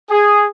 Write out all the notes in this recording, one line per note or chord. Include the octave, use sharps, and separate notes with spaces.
G#4